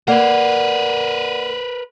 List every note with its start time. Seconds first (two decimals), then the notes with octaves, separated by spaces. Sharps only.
0.08 A#3 A#4 B4 D5 F#5